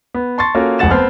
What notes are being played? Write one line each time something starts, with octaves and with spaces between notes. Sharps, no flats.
B3
A5 C6 C#6 A6
A#3 C#4 F4 F#4 A4 A#4
F1 F2 G#3 F#5 A6 E7
B3 C4 A5 C6 F6